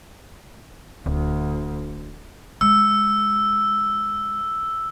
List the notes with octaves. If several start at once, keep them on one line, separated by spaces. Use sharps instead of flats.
D1 D2
G#3 E6